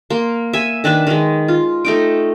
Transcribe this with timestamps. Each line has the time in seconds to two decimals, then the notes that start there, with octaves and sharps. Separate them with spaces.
0.10 A#3 C6
0.53 E5 G#5
0.84 D#3 D4 B4 E5
1.07 D#3 G#3
1.48 F4
1.85 A3 D#4 G5